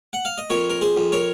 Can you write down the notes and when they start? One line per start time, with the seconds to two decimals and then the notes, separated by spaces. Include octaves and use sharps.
0.13 F#5
0.25 F5
0.38 D#5
0.50 F2 A#4 C#5
0.70 A#4
0.81 G#4 C5
0.97 F2
1.12 A#4 C#5